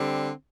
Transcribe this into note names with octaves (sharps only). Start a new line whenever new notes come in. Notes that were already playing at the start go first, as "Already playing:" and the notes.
Already playing: D3 G3 C4